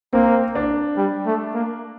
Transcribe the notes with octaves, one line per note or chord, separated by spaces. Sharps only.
A#3 C4
D4
G3
A3
A#3